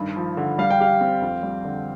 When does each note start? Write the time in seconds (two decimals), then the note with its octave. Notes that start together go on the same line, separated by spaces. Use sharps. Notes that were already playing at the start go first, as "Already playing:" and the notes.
Already playing: G2 D#3
0.16 F3
0.37 D3
0.58 G3 F5
0.70 G5
0.80 G4 F5
1.01 C4
1.22 F2
1.43 G3
1.65 D3